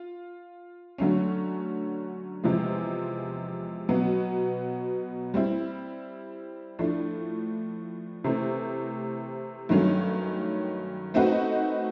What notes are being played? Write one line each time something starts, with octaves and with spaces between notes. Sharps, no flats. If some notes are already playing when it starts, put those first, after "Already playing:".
Already playing: F4
D3 F#3 A3 C#4
E2 C3 F3 G#3
B2 F#3 B3
G3 C4 E4
A2 F3 A3 D4
C3 E3 A3 C4
G2 D#3 F#3 A3 C#4
A3 C4 D#4 F#4 B4